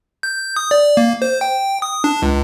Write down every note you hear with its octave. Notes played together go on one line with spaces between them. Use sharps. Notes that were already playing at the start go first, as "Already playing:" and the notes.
G6
D#6
D5
A#3
C5
G5
D#6
D4
C#2